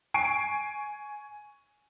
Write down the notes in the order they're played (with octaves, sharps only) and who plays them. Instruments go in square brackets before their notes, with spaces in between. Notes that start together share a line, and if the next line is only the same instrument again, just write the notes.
[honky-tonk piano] G#5 C#6 C7 D7